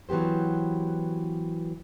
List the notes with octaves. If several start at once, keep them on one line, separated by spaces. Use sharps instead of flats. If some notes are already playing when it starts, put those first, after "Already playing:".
E3 F#3 B3 G4 C5